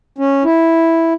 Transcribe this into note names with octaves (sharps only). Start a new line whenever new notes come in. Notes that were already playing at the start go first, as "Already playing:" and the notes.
C#4
E4